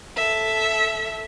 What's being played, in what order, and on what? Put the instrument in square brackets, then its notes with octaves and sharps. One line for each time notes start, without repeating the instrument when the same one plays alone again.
[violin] A4 E5